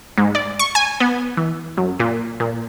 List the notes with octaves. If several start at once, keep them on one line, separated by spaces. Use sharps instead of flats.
G#2
D5
C#6
G#5
B3
E3
F#2
A#2
A#2